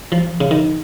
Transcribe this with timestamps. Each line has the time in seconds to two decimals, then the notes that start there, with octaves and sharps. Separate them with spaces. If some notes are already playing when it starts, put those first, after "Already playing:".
0.12 F3
0.41 C#3
0.51 D#3